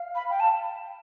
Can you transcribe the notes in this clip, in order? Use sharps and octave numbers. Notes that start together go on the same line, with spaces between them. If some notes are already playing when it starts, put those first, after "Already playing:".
Already playing: F5
B5
G5
A5